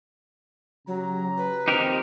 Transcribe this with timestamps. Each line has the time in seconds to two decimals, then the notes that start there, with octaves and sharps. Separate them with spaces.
0.87 C#3 F#3 G4 A#5
1.37 B4
1.68 D#2 F3 C4 D#4 G4 A#4